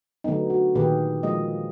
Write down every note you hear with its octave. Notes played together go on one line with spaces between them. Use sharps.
D3 F#3 A3 B3 D#4
F#4
A#2 D#3 G4 G#4 B4
F3 G#3 A#3 D#5